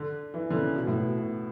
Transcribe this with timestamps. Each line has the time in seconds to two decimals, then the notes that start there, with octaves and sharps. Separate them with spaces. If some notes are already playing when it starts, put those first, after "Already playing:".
Already playing: D3
0.34 E3
0.50 D3
0.55 C#3
0.75 B2
0.87 A2
0.97 B2
1.18 B2